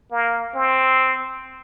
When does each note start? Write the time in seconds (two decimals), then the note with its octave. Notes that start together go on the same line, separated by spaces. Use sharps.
0.11 A#3
0.55 C4